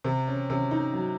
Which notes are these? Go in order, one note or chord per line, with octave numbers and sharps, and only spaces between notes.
C3
C#4
C3 C#4
D#4
F#3